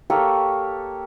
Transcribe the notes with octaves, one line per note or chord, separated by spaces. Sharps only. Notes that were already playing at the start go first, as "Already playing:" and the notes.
A#3 G4 A4 C#5